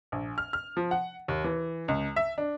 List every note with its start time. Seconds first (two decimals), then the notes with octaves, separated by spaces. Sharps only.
0.12 A#1
0.38 F6
0.53 F6
0.77 F3
0.91 F#5
1.28 D#2
1.44 E3
1.88 C#2
2.16 E5
2.38 D4